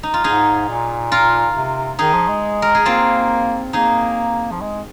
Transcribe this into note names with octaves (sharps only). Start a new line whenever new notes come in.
D#4
F4
G#2 D#4 G#4
A#2
F4 A#4
C3
D#3 D#4 G#4
F3
G#3
A#4
G#4
A#3 C4 F4
A#3 D#4 G#4
F3
G#3